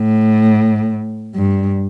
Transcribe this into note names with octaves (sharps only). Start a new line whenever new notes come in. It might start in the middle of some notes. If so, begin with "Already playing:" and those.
Already playing: A2
G2